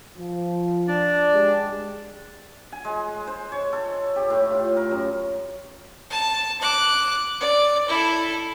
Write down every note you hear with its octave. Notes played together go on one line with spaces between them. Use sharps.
F3
D4 D5
G#3 G4
G#5
G#3
C5
C#5
A4
G4
A2
F4
A#4
F#2
A5
D6 F#6
D5
E4 A4